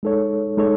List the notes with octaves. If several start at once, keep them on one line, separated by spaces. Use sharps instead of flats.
G#3 D#4 A4 C#5
G#3 D#4 A4 C#5